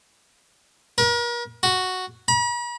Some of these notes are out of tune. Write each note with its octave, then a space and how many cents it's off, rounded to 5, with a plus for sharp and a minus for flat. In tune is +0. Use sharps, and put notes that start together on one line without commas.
A#4 +40
F#4 +0
B5 -45